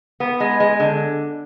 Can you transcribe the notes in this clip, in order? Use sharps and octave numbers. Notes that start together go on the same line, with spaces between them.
B3
G#3
G#3
D3